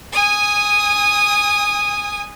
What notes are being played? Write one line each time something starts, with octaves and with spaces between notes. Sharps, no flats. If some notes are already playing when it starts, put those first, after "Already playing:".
G#5 D#6